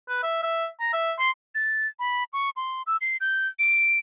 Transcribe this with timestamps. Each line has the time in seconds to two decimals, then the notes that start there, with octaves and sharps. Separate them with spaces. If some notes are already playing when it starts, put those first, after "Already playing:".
0.08 B4
0.23 E5
0.43 E5
0.80 A#5
0.93 E5
1.19 C6
1.55 A6
1.99 B5
2.33 C#6
2.56 C6
2.87 E6
3.01 C7
3.21 G6
3.59 D7